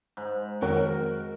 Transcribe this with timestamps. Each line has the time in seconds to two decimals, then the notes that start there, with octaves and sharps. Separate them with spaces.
0.17 G#2
0.62 F2 D#3 F#3 F#4 A#4